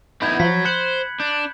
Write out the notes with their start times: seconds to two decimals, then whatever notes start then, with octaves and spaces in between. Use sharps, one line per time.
0.22 B3 D#4 E4 B5 G6 G#6
0.40 F3 F#3 B6
0.65 C5 F#6 C#7 F#7
1.20 D4 G6